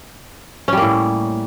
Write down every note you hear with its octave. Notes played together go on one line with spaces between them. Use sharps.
A2 G3 A#3 C#4